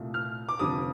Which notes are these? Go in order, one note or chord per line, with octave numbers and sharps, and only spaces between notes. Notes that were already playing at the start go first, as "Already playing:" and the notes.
Already playing: C2 A#2 A3
F6
D6
F1 F2 D3 G3 D#6